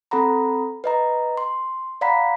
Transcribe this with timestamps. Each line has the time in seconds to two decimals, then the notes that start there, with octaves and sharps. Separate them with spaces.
0.11 C4 A4 F#5 A#5 B5
0.84 B4 D#5 A#5
1.37 C6
2.01 D5 F5 F#5 A#5 B5 B6